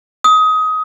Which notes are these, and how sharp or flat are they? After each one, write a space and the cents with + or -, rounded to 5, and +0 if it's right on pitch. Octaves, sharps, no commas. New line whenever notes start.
D#6 +20